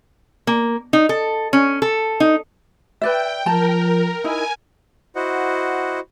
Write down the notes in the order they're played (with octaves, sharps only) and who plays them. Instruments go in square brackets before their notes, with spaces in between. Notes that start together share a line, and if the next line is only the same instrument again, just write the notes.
[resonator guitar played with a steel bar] A#3
D#4
A4
C#4
A4
D#4
[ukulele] B4 D5 E5 [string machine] G5
[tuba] F3 [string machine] A#4 [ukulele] A5 A#5
[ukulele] D#4 E4 [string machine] G#5
[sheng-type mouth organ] E4 F#4 C5 D#5 F#5